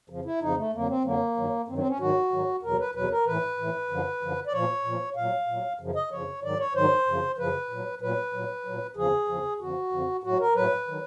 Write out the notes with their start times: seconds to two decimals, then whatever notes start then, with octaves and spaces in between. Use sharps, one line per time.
0.10 F2 C#3 F3
0.25 E4
0.41 F2 C#3 F3 D#4
0.57 A3
0.73 F2 D3 F#3 A#3
0.89 C4
1.04 F2 D3 F#3 A#3
1.37 G2 D#3 F#3
1.68 G2 D#3 F#3 C4
1.78 C4
1.88 C#4
1.99 G#2 D#3 F#3 F#4
2.32 G#2 D#3 F#3
2.63 E2 B2 F#3 A#4
2.79 B4
2.95 E2 B2 F#3 B4
3.11 A#4
3.26 A2 E3 B4
3.58 A2 E3
3.89 F#2 D3 F3
4.22 F#2 D3 F3
4.47 D5
4.52 A#2 F3 C#5
4.84 A#2 F3
5.16 A#2 F#3 F5
5.47 A#2 F#3
5.79 F#2 C#3 F3
5.95 D#5
6.11 F#2 C#3 F3 C#5
6.43 G#2 D#3 F#3 D5
6.59 C#5
6.75 G#2 D#3 F#3 C5
7.06 F#2 C#3 F3
7.38 F#2 C#3 F3 B4
7.70 A#2 F#3
8.01 A#2 F#3 B4
8.33 A#2 F#3
8.65 A#2 F#3
8.96 E2 C#3 F3 G#4
9.28 E2 C#3 F3
9.60 F2 D3 F3 F#4
9.92 F2 D3 F3
10.24 A2 F#3 F#4
10.40 A#4
10.55 A2 F#3 B4
10.88 D#3 F#3